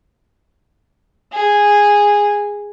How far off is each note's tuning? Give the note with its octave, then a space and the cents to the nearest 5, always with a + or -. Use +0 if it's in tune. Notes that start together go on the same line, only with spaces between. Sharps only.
G#4 -10